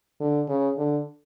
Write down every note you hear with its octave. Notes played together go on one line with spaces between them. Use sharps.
D3
C#3
D3